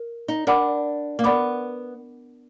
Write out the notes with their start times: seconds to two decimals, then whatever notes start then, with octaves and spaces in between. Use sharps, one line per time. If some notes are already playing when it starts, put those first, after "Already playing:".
Already playing: A#4
0.28 D#4
0.47 D4 A#4 D5 F#5 B5 D6
1.19 A#3
1.24 B3 A#4 D5 F#5 B5 D6